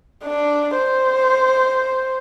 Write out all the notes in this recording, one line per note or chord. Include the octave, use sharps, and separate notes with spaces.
D4
C5